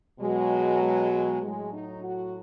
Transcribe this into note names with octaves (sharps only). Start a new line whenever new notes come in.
B2 F#3 G#3
G#3
G#3
A2 F#3 G#3
D#4
F#4